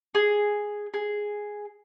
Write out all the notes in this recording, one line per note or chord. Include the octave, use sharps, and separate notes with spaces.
G#4
G#4